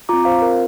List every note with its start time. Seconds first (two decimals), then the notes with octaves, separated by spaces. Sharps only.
0.09 C4 F4 A#5 D6
0.25 C5 F5
0.42 A#4